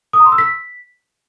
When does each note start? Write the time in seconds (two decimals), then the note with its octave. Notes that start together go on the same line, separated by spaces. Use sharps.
0.13 D#6
0.20 A#5
0.26 C6
0.32 E6
0.38 B6